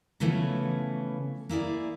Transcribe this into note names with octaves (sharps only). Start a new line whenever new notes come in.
C#3 E3 F3 A3 B3 C#4
A#3 E4 G#4 D5